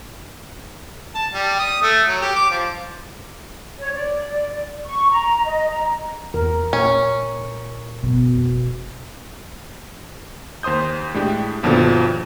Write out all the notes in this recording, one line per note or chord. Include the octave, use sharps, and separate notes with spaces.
A5
G3
D#6
A3
F#3
G4
D6
F3
C#5
D5
C#6
A#5
D#5
A#5
E2 A#4
A#2 C#4
G1 B2
F#1
D#2 C5 C6 D#6 G6
A2 G#3 D4 G4
G1 D#2 B2 F3 D4 A4